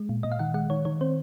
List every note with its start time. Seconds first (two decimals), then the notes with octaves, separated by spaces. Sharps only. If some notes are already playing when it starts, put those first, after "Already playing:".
Already playing: G#3
0.09 A#2
0.23 A#2 D#5
0.32 F5
0.39 D#3 F#5
0.54 G#3 F#5
0.70 D#3 C#5
0.85 D#3 C#5
1.01 C4 C5